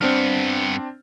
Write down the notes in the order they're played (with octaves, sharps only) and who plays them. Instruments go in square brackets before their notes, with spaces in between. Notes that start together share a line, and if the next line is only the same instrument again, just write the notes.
[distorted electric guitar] G2 B3 [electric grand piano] C4 D4 F6